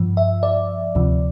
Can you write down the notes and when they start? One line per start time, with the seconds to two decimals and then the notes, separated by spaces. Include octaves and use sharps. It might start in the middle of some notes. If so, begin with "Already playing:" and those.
Already playing: G2 F3
0.17 E5
0.43 D5
0.95 D2 C3 F3